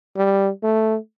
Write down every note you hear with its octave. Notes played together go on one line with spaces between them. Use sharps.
G3
A3